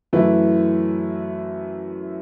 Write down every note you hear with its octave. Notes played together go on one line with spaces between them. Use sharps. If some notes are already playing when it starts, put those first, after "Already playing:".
F#2 E3 A3 E4 B4